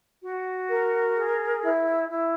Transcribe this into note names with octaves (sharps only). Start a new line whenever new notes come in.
F#4
A#4
G#4
E4
E4